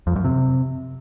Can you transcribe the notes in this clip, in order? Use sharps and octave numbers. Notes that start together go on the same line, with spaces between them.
F2
F#2
C3